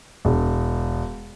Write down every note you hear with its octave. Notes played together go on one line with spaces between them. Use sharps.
E1